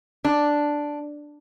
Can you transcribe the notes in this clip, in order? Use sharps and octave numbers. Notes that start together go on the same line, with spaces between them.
D4